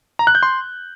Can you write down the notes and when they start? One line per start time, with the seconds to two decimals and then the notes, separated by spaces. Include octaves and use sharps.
0.19 A#5
0.27 F#6
0.35 G6
0.43 C6